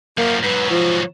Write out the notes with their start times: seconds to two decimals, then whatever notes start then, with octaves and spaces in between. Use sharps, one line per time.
0.18 F#2 F3 A#3
0.44 G#2 F#3 B4
0.70 F3